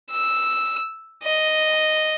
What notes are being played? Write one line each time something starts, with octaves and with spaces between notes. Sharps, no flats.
E6
D#5